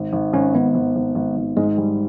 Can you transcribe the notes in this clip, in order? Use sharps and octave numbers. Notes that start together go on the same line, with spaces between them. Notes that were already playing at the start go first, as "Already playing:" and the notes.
Already playing: G#1
G#1
G#1 C#4
G#1 B3
G#1
G#1
G#1
G#1
G#2 G#3
G3